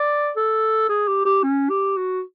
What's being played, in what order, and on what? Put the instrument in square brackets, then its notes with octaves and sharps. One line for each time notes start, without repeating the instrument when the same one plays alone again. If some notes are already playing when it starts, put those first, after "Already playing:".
Already playing: [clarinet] D5
A4
G#4
G4
G4
C#4
G4
F#4